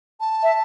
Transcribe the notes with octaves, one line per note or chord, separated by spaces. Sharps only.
A5
E5